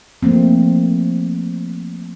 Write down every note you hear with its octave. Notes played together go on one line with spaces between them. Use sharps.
F3 A3 A#3 C4